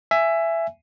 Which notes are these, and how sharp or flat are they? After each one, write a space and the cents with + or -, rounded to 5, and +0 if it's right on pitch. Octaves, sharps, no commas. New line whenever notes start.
E5 +15 G#5 +0